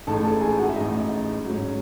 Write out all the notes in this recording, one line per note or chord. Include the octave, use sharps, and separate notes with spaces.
A1 A2 G#3 D#4 A4 A5
A4 A5
G#4 G#5
F#4 F#5
E5
A1 A2 G#3 D#4 D#5
G#2 F#3 C#4